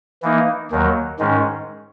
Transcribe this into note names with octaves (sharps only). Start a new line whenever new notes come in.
E3 A#3 D#4
D#2 D#3 F#3
G#2 D#3 G#3 C#4